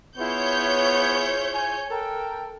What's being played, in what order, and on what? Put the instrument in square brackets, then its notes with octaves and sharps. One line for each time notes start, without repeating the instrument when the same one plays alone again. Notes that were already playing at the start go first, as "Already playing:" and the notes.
[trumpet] B3 [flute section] E4 F4 G#4 [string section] C#5 G6
[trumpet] G#5
[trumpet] A4 [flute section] A#4 G5